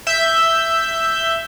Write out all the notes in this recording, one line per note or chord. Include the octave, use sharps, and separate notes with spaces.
E5 G6